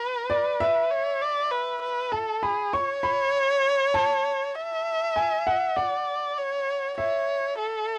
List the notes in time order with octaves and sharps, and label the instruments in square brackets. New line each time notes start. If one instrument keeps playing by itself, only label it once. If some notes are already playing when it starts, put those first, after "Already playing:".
Already playing: [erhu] B4
[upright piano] D5
E5
[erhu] C#5
D5
B4
B4
[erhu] A4 [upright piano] A5
[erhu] G#4 [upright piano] B5
[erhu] C#5 [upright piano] C#6
[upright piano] B5
A5
[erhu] E5
[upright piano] G#5
F#5
[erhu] D5 [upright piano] F#5
[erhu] C#5
[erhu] C#5 [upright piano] E5
[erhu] A4